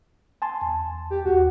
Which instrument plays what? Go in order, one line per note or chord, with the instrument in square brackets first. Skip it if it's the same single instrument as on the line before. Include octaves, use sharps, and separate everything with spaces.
[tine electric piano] G#5 A5 C6
E2
[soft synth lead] G4
[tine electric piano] D#2 F#5 [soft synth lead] F#4